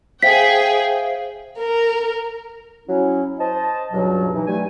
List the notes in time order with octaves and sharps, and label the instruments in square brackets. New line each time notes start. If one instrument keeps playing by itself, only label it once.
[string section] G#4 G5 [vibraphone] C5 E5 F5 [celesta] B6
[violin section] A#4
[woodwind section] F#3 C#4 E4
C5 D#5 A5
C#2 G2 B2 F#3
E3 D#4
G2 G3 A3 G#5